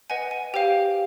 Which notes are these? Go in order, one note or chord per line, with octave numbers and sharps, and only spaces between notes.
B4 D#5 F#5 G#5
G#5
G4 C5 F5 G5